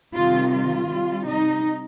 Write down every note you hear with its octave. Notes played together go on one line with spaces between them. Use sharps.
C3 D#3 G3 F4
F4
C3 G3
D#4